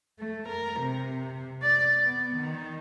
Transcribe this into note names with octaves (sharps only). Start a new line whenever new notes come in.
A3
A#4
C3
D5
B3
D#3